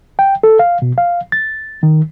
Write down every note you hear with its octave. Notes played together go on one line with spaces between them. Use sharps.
G5
A4
F5
B2
F5
A6
D#3